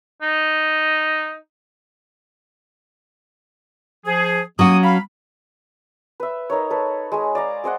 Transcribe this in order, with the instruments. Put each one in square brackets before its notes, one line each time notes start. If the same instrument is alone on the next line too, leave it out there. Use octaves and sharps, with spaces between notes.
[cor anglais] D#4
[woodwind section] F3 G#4
[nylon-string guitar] F#3 C#4 F#4 [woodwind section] A#3 D#6
[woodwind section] F5 B5
[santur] B4 E5
D#4 A#4 C#5
A4 B4
G#3 G#4
D5 F5 A#5
G#4 C5 D#5 F#5